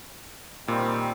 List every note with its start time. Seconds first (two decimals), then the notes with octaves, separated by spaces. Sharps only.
0.68 A#2 D#3 G3 C4